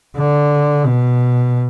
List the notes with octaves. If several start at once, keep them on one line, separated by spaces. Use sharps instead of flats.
D3
B2